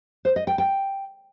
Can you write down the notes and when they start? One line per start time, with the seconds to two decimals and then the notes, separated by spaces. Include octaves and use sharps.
0.25 C5
0.36 D#5
0.47 G5
0.58 G5